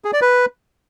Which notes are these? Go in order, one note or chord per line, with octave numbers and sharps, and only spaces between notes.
G#4
D5
B4